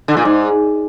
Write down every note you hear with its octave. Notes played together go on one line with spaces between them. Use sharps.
D3
A#2
G#2